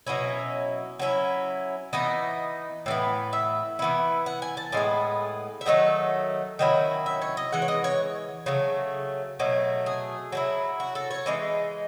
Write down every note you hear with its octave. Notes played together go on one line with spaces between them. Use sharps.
B2 F#3 C#4 E4
F#3 C#4 E4
E3 B3 D#4 D#5
A2 E3 B3
E5
E3 B3 E4
F#5
G#5
A5
A2 G#3 B3 G#5
E5
D#3 F#3 A3 D#4 F#5
D#3 F#3 C#4 E4
E5
C#5
D#5
E3 G#3 F#5
C#5
D#5
C#5
C#3 F#3 A3
B2 F#3 A3
G#4
F#3 A3 E4
F#4
A4
C#5
E3 G#3 D#4